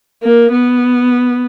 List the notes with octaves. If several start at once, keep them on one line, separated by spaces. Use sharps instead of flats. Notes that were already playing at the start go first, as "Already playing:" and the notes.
A#3
B3